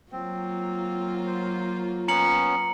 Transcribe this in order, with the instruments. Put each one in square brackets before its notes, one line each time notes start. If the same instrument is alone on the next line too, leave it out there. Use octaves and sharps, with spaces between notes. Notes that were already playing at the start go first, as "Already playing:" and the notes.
[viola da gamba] F#3 A#3 F4 [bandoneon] C4
[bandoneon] C5
[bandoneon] B3 C#4 [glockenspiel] A#5 C#7 F#7